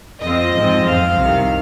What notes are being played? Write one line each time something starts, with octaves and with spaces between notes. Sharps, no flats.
F2 F3 C4 F4 D#5
G#2 F3 C4
F2 F3 C4 F5
C2 C3 D#3